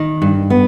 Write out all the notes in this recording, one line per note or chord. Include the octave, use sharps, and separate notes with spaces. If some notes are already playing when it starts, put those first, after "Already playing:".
Already playing: D#3
G2
B3